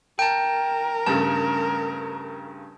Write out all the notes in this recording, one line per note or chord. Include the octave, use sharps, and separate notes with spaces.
A#4 G5 A5
G2 C#3 A3 A5